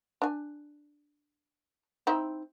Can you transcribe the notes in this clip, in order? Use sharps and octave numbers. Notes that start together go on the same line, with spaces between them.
D4 G#5
C4 D#4 E4